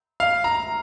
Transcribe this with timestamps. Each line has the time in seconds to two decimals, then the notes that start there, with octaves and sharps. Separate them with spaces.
0.20 F5
0.44 A#5